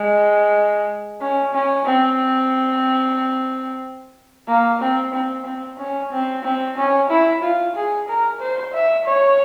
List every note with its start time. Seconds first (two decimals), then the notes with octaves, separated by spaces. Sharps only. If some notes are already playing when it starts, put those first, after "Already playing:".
Already playing: G#3
1.21 C#4
1.54 C#4
1.86 C4
4.48 A#3
4.81 C4
5.14 C4
5.46 C4
5.79 C#4
6.12 C4
6.44 C4
6.78 C#4
7.10 E4
7.43 F4
7.76 G#4
8.08 A#4
8.41 C5
8.74 E5
9.06 C#5